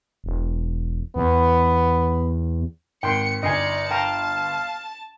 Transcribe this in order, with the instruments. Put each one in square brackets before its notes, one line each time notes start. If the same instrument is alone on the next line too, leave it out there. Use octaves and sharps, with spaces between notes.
[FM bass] E1
[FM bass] E2 [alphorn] B3
[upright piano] G#1 [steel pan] G5 C6 [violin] C#7
[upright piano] G1 C7 [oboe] D#4 [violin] D5 C#7 [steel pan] D#5 G#5
[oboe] F5 [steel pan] G5 A#5 [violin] A5